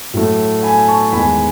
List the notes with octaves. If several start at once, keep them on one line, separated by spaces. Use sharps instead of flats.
A2 F#3 A3
G#5 B5
A5 C#6
E2 D#3 G#3 G#5 B5